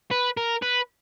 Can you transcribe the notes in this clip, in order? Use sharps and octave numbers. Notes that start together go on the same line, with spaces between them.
B4
A#4
B4